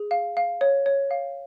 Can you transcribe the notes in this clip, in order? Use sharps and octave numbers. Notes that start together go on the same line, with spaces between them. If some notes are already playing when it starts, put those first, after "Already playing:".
Already playing: G#4
F5
F5
C#5
C#5
F5